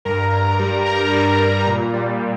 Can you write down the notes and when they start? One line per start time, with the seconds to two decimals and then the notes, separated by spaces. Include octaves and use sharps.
0.05 G2 A#4 A#5
0.33 G2
0.59 G3
0.86 G2 A#4 A#5
1.13 G3
1.40 G2
1.67 A#2
1.94 G3
2.20 G3